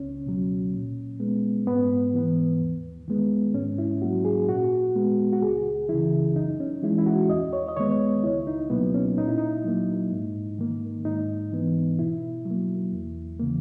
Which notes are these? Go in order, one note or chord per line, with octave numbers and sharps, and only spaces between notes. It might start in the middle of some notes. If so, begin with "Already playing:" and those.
Already playing: C#2 C#4
B2 F#3
A#2
G#3 B3
G#2 B3
E3 B3
D#2
D#3 G#3 B3
G#2 C#4
E4
F#3 A#3 F#4
G#4
A#2 F#4
G#3 B3
F#4
C#2 G#4
C#3 E3 E4
F#2 D#4
C#4
E3 G#3 E4
E4
F#4
D#2 D#5
C#5
D#5
D#3 G#3 B3 C#5
C#2 E4
D#4
B2 F#3 A#3 B3
C#4
A#2 D#4
E4
D#4
F#3 A#3
G#2
D#3 A#3
G#2 D#4
E3 B3
B2 E4
F#3
A#3
E2
C#3 E3 A#3